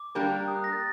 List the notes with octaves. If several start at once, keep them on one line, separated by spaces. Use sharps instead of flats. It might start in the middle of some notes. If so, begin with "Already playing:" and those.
Already playing: D6
G3 A#3 D4 G4 A#4
D#6
F#6
A#6
A6